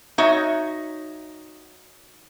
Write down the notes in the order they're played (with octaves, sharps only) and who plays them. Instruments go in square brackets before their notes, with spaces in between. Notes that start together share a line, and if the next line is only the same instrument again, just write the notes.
[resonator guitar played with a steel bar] D#4 F#4 C#5 E5